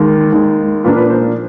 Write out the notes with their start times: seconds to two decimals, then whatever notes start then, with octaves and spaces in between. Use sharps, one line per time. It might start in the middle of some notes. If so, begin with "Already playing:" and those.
Already playing: D#2 D#3 G#3
0.32 D#2 D#3 G#3
0.84 A#2 F3 A#3 D4 B4
0.96 B4
1.10 C5